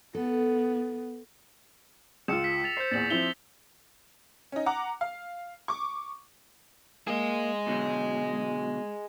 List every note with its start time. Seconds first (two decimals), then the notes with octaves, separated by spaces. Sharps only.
0.15 B3 A4
2.28 C#2 F4 E6 C#7 E7
2.44 B6
2.64 A6 F7
2.77 C5 G6 C7
2.91 E2 A#2 A6 F#7
3.10 F3 C4 E4 E6 F7 G7
4.52 C#4 D#4
4.66 F#5 A#5 D6
5.01 F5
5.68 C#6 D6
7.07 A#3 G#4 D#5
7.67 B2 D3 F#3